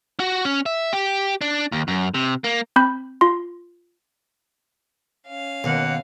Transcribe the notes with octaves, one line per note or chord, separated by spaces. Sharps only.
F#4
C#4
E5
G4
D4
D#2
F#2
C3
A#3
C4 B5 G6
F4 C6
C#4 F5
D#2 B2 A#3 F#5